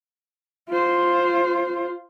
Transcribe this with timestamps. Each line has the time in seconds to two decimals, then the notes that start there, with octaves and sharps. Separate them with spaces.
0.69 F4 C5